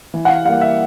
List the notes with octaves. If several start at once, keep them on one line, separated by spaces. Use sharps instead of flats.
E3
F#5
F5
G3 A#3 F5
E5